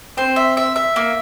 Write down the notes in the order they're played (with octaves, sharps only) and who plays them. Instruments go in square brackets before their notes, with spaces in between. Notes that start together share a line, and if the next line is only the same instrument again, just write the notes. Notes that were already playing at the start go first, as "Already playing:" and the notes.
[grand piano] C4 [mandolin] C5
[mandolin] E5
E5
E5
A#3